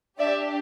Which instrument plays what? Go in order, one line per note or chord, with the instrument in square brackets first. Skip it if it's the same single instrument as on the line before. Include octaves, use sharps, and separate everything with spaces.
[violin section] D4 G4 D5 E5